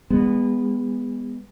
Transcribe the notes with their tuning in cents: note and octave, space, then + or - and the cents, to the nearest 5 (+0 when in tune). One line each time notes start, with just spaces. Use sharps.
G#3 -30 B3 +0